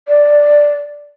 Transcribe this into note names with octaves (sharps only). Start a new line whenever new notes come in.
D5